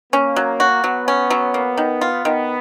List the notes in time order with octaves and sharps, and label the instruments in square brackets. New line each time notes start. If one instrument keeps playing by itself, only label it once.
[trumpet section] A#3 [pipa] C#4
[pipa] F#3
F#4
[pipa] F#3 [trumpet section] B3
[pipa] C#4
F#3
A#3
D#3
F4
[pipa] D#3 [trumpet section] B3